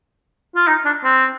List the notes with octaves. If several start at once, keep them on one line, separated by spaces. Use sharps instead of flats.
F4
D#4
D4
C4